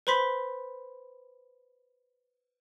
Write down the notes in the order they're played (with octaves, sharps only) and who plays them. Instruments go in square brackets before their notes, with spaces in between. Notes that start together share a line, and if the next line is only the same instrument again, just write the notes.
[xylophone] B4 C5 B5 C6 B6